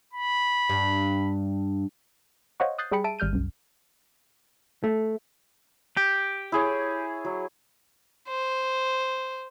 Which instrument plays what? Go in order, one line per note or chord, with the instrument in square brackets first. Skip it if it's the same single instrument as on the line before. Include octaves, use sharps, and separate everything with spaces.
[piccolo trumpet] B5
[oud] G2
[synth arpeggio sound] C5 C#5 D#5 F5 F#5 C#6
D#6 F#6 G6 A6 C7
G3 G#4 G5 B5 C#7
E5 A5 D7 D#7
G#1 G3 F6 G6 D#7
C2 F#2
[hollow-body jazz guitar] A3
[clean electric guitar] G4
[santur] E4 G#4 C#5
F#3
[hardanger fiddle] C5